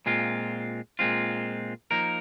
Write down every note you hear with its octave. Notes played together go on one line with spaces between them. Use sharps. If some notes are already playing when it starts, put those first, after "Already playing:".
A#2 G#3 C4 F4
A#2 G#3 C4 F4
F3 A#3 D#4 A#4